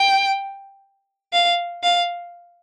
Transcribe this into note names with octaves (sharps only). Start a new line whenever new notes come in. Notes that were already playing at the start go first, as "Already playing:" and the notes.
Already playing: G5
F5
F5